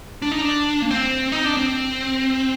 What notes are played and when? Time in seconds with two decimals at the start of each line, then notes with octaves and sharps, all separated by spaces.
0.22 D4
0.32 D#4
0.41 D4
0.82 A#3
0.91 C4
1.32 D#4
1.45 D4
1.57 C4